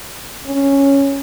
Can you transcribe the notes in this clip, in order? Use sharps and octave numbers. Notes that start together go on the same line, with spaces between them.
C#4